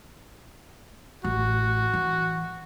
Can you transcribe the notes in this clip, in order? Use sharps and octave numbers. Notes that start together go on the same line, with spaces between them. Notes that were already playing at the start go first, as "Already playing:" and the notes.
A1 F#4
E3